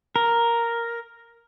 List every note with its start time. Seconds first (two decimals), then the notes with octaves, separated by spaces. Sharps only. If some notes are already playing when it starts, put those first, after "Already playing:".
0.16 A#4